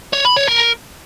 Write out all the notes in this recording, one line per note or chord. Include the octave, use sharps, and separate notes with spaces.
C#5
B5
C#5
A#4